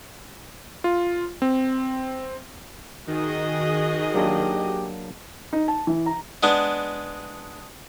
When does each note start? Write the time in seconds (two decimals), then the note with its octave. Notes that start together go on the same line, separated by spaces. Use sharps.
0.84 F4
1.42 C4
3.07 D#3 F#4 G#4 D#5
4.14 F#3 A#3 D4 G4
5.53 D#4
5.68 A5
5.87 E3
6.06 A#5
6.43 G#3 B3 D4